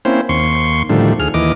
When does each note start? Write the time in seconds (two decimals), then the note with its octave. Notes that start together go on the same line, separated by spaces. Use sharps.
0.05 A#3 C4 C#4 E4 C5
0.29 D#2 C6 C#6
0.90 A2 D3 D#3 F3 G3
1.20 D2 G#4 F6
1.34 D#2 E3 D#5 D6